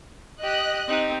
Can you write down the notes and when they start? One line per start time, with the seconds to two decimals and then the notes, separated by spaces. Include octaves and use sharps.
0.42 G4 D#5 F#6
0.88 C4 D#4 G4